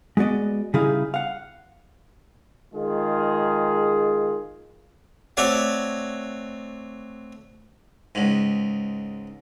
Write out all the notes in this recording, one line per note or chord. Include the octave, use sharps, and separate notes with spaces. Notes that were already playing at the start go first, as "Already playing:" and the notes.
G#3 B3 F#4 D5 D#5
C#3 G3 D#4 E4 G#4 F5
F5 F#5
D#3 G#3 F4 G#4
A3 C4 F#4 C#5 D5 F#5
C#2 G#2